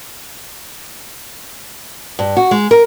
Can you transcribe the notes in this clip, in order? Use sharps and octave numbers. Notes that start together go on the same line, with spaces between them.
G2
F#4
G#3
A#4